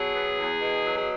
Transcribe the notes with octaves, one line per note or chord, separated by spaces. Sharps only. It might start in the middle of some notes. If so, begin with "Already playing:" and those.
Already playing: B2 F#3 G#4
B3
E2
B2
F#3
G#4